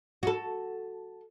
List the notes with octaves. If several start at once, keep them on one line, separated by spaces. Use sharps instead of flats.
F#4 A4